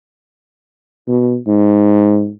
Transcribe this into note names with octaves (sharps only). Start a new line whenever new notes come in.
B2
G#2